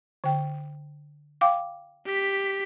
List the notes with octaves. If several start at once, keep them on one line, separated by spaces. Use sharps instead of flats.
D3 G5
F5 G5 D6
G4 B6